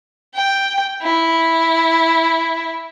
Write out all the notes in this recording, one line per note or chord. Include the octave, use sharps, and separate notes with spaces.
G5
E4